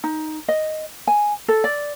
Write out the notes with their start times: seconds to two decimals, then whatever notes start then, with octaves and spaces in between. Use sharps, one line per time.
0.04 D#4
0.48 D#5
1.07 G#5
1.48 A4
1.64 D5